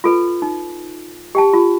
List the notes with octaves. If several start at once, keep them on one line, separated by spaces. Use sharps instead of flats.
F4 A4 B4
D#4
G4 G5 A5
F4